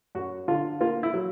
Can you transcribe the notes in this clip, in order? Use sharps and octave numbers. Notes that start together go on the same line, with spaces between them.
F#2 F#4
D3 F4
A#3 F4
E4
F#3